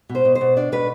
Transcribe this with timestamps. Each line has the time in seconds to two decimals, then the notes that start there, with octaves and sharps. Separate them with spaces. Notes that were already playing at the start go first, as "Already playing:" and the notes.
0.09 B2
0.15 C5
0.25 B2
0.35 C5
0.41 B2
0.57 D4 D5
0.72 B2 B4